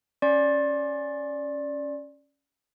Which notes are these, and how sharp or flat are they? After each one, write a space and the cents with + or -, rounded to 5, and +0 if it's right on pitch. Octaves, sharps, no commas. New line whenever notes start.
C#4 +0 D5 +0 C6 +40